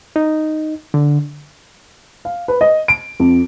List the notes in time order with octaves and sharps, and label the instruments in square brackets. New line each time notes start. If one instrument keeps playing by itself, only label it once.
[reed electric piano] D#4
D3
[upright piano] F5
B4
D#5
D7
F2